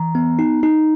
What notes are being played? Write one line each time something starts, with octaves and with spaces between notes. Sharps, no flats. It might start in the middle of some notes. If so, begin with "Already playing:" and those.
Already playing: E3 A#5
B3
D#4
D#4